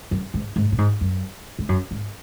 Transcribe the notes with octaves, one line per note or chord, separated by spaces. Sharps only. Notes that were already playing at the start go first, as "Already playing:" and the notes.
F#2
G#2
G#2
A#2
G#2
F#2
G#2
F#2
G#2